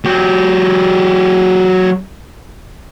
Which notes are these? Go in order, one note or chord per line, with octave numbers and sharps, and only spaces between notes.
F#3 G4